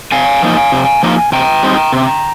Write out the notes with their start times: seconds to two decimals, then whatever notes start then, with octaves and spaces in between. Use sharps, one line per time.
0.12 C3 F5 G#5
0.43 F3 A#3 D#4
0.72 C3
1.03 F3 A#3 D#4
1.32 C3 G5 A#5
1.63 G3 C4 D#4
1.92 C3